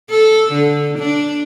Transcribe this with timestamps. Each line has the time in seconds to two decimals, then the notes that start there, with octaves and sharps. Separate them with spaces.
0.11 A4
0.52 D3
0.99 D4